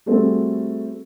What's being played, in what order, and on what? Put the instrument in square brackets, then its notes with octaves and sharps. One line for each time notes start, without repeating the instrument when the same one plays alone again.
[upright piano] G3 A3 C4 F#4 G#4 A4